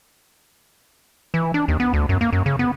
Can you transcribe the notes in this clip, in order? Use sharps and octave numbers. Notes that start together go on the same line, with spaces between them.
E3
D4
D#2
B3
D2
F#2
A#3
F#2
C#3
B3